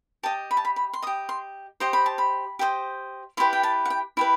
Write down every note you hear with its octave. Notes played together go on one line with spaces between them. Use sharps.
G4 D#5 A5
B5
A5
B5
B5
C6
G4 D#5 D#6
C6
G4 C5 D#5 C6
B5
A5
B5
G4 C5 D#5
E4 G4 B4 C6
G5
A5
F#5
G5
E4 G4 B4